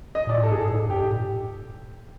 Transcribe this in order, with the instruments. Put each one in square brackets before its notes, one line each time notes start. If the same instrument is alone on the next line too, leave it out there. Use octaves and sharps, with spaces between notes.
[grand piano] D#5
[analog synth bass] A#2 [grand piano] D5
[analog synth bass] A2
[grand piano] A4
[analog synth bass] G#2 [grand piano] G#4
[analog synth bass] G2 [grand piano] A4
[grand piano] A4
[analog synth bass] G#2
G2
[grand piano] G4
[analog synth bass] G#2
A#2